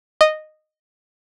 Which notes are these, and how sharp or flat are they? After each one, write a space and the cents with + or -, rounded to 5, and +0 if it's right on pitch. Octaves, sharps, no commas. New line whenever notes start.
D#5 -10